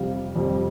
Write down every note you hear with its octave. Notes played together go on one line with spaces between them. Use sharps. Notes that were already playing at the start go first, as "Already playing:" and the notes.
Already playing: F2 C3 G3 F5
F2 C3 G3